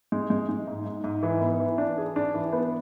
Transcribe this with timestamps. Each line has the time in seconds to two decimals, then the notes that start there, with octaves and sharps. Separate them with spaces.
0.12 G#3
0.30 G#3
0.49 G#3
0.67 G#2
0.86 G#2
1.04 G#2
1.23 E3
1.41 B3
1.60 E3
1.78 D4
1.98 G#4
2.16 D4
2.34 E3
2.53 B3